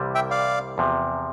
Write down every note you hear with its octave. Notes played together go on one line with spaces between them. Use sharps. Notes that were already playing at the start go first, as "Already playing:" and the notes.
Already playing: C2 C3 E3 G3
E5 G5
D5 F5
E2 C3 F3